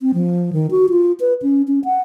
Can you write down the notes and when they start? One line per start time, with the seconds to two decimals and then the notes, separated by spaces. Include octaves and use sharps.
0.01 C4
0.14 F3
0.53 D#3
0.71 F#4
0.90 F4
1.20 B4
1.42 C#4
1.68 C#4
1.85 F#5